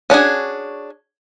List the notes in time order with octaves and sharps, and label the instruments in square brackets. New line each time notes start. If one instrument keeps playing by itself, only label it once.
[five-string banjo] C#4 D4 F#4 G#4